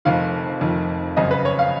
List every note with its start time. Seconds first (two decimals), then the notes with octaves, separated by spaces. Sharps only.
0.05 F1 F2 D#3 F5
0.61 F1 F2 D#3
1.17 G#1 F#2 C#3 D#5
1.31 B4
1.45 C#5
1.59 F5